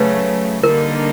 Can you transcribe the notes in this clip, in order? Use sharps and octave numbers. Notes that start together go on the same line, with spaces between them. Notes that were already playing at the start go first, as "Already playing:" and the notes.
Already playing: C#3 F#3 A3 B4
D3 G3 A#3 D#4 A#4